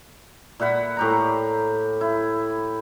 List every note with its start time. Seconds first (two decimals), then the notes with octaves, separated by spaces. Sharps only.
0.60 A#2 E5 F#5 B5
0.97 A2 G4 A#5
2.01 E4